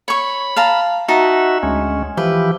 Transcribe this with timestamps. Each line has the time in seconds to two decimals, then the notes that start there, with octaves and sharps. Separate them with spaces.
0.08 C#5 B5 C#6
0.56 F5 A5 A#5
1.08 D#4 F#4 E5 F#5 A5
1.63 D2 G#3 C#4
2.17 E3 F3 G4 B4